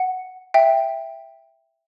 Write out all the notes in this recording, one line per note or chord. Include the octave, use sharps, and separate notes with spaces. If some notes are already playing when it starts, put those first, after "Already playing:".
Already playing: F#5
E5 G5